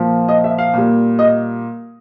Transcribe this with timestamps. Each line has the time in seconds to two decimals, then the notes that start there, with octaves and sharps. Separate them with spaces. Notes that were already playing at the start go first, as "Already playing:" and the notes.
Already playing: A#2 F3
0.29 D#5
0.44 E5
0.58 F5
0.74 A#2 G3
1.19 D#5